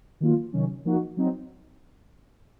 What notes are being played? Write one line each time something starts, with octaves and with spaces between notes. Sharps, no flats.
D#3 F#3 A#3 F4
C3 D#3 F#3 C#4
F3 A#3 D#4 F#4
F#3 C4 D#4